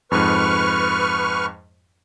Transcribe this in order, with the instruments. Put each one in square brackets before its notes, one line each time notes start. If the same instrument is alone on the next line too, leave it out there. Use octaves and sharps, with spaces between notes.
[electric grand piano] F2 G#2 [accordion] B4 C#6 F6